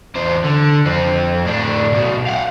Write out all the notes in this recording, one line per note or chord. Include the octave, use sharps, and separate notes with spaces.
E2 C5
D3
F2 C4
A2 D4
B1 B2
F5 F#5